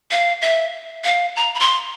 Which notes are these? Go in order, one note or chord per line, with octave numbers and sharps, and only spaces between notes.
F5
E5
F5
A#5
B5
C6